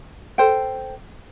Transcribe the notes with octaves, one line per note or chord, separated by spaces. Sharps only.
A4 C5 G5